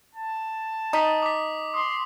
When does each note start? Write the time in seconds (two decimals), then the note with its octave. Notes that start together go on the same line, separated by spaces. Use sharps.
0.15 A5
0.93 D#4 D#6 B6
1.23 D6 B6
1.74 C6 D#6